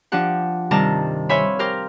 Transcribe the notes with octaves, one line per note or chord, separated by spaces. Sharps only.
F3 D4 G4 F#5
G2 C3 D#3 G3 A5 A#5
C5 C#5 E5 F5 G#5 B5
G4 A#4 C5 F6